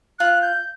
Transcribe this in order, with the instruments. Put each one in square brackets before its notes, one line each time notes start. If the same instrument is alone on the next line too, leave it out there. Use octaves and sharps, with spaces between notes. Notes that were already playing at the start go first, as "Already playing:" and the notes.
[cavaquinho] F4 [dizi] F#6
[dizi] G6